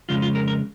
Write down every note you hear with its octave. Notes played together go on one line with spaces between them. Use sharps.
F2 C#3 G#3 F4
F4
A#4
A#4